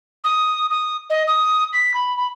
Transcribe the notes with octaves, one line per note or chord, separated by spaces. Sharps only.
D#6
D#6
D#5
D#6
B6
B5
B5